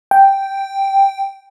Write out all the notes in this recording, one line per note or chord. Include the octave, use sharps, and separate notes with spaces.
G5